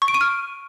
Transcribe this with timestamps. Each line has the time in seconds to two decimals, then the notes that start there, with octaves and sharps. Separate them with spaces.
0.02 C#6
0.08 D7
0.14 D#7
0.21 F6